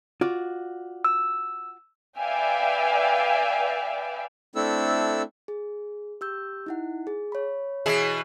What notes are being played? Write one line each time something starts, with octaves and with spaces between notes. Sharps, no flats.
F4 F#4 D5
E6
B4 D5 E5 F5 G5 G#5
A3 C4 D4 E4 A4 E6
G#4
G4 E6 G6
D#4 E4 F#5
G#4
C#5 B5
B2 E3 G#4